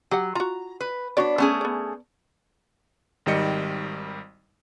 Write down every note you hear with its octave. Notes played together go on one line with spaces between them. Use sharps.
F#3 G4 F#5
F4 F#4 A#5
B4
B3 D4 F#4 C#5 D5
A3 B3 C#4 G#4
B3 D5
G#1 D#3 G3 D#5 C#7